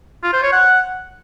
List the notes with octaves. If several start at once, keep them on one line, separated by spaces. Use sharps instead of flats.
F4
C5
C#5
F#5